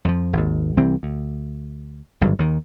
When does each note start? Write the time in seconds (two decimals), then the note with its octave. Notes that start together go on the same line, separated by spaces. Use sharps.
0.05 F2 F3
0.33 G#1 D#2
0.77 C2 E3 G3 C4
1.03 D2
2.21 G#1 G2 D3 F#3
2.39 D#2 D#3